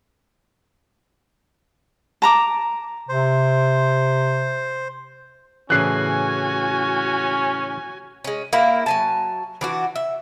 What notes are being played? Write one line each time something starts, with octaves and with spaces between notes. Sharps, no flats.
A5 A#5 D6
C3 C5
A2 C#3 E3 C#4 F#4 G#5 F#6 C7
G#3 C#4
A#3 E4
F#3 G#5 A5
E3 D4 F#4
E5